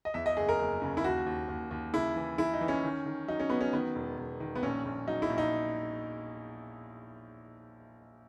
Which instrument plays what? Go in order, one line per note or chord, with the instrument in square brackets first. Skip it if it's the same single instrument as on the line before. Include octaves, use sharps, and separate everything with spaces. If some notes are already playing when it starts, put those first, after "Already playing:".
[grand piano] D#5
E2 E5
D#5
F#1 G#4
A#4
F#1
C#3
E4
D#2 F#4
D#2
D#2
D#2
C#3 E4
E3
E3 E4
D#4
E3
C#4
D#3
D#3
F#3 D#4
C#4
F#3 B3
C#4
D#3 B3
E1
E1
D#3
B3
A#1 C#4
A#1
F#3 D#4
E4
A#1
D#4